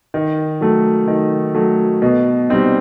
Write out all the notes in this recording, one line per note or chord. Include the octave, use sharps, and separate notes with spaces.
D#3
F#3 A3
D#3
F#3 A3
B2
G3 C4 D#4